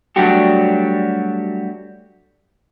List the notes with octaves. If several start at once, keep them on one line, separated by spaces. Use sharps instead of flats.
F#3 G3 A3 D4 F#4 G4